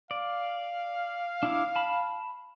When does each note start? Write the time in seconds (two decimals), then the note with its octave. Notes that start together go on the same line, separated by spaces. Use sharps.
0.11 D5 F5
1.43 D4 E4 D6
1.75 A5 B5